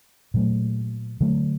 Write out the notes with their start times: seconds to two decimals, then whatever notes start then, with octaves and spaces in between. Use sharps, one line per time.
0.34 A#2 F#3 A3
1.21 D3 F#3 A3